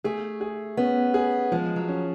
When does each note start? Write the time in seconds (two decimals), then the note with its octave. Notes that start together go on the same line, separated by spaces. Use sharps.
0.04 A3 G#4
0.41 G#4
0.77 B3 C#4
1.14 G#4
1.52 F3 G#3
1.76 F#3
1.89 C#4